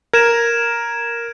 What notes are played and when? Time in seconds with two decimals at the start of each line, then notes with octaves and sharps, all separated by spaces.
0.13 A#4 G#6 D7 E7